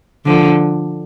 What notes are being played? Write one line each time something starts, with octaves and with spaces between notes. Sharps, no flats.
D3 F3